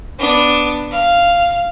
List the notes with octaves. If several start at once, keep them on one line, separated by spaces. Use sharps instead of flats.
B3 D4
F5